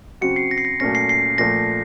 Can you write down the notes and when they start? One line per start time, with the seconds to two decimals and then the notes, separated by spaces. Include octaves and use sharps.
0.21 C#3 F#3 C4 F#4 C#7
0.36 C7
0.51 A#6
0.58 C7
0.65 A#6
0.80 A#2 F#3 A3 C#4 A#6
0.95 C7
1.09 C7
1.38 A#2 F3 A3 A#6